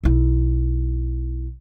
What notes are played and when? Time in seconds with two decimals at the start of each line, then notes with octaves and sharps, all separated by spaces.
0.04 B1 E4